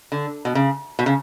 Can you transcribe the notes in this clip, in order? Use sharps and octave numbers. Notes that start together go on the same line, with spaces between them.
D3
B2
C#3
B2
C#3